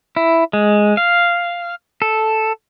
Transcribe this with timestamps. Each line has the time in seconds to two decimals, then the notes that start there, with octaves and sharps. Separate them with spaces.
0.16 E4
0.53 G#3
0.97 F5
2.02 A4